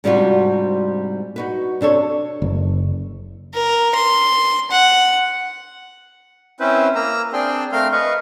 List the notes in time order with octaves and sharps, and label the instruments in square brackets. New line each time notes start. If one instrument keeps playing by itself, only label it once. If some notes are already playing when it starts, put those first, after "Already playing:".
[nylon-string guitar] G#2 C3 G3 D4 F4 F#4
D#4 F#4 B4
C3 D4 A4 C#5
[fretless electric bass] F#1
[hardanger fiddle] A#4
C6
F#5
[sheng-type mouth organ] C4 C#4 E4 B4 C5
A#3 A#5 E6
C4 D4 G#4 G5 C6
A3 C4 A#4 F5 C6 F6
B4 D#5 F5 C#6